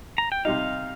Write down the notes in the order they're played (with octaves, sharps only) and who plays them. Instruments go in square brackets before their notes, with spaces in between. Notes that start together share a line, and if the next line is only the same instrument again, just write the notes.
[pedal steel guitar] A#5
G5
[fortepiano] C3 G3 D#4 [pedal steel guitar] F5